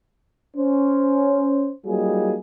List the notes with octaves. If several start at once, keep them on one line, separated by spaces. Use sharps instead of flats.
C#4 C5
F#3 G3 A#3 D#4 F4 G#4